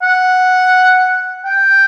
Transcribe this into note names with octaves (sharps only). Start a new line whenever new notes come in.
F#5
G5